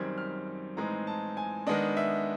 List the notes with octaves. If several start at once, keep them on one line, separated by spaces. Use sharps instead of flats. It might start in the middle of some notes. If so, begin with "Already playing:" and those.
Already playing: F#2 D#3 G3 C4 G#6
F6
A2 E3 G#3 C4 D#4 A#5
A5
G#5
D#3 G#3 B3 D4 D#5
E5